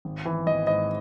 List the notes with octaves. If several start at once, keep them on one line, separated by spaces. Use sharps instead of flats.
G#1
E3
G#1 D#5
G#2 D#5